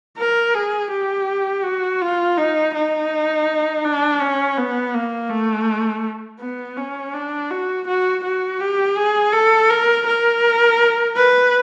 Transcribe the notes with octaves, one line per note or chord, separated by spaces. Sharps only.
A#4
G#4
G4
F#4
F4
D#4
D#4
D4
C#4
B3
A#3
A3
B3
C#4
D4
F#4
F#4
F#4
G4
G#4
A4
A#4
A#4
B4